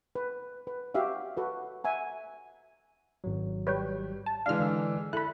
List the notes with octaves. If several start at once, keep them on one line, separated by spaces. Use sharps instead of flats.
B4
B4
F#4 G4 E5 F5
F#4 A4 B4
E5 F#5 G#5 A#5
G#1 F#3
G3 B4 C#5 G5
A5
E3 G#3 D4 F5 F6
D3 E6
E4 A4 B5 F#6